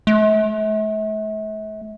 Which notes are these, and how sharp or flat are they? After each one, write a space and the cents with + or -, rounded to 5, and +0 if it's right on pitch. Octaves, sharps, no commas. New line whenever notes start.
A3 -40